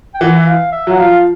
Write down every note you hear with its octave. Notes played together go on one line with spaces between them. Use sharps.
G5
E3 F#5
E5
F5
E5
F#3 F#5
F3 F5